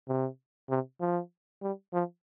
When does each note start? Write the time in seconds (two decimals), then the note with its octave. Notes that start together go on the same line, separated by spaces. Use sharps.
0.08 C3
0.70 C3
1.00 F3
1.62 G3
1.93 F3